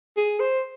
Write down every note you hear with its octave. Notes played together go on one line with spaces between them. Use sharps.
G#4
C5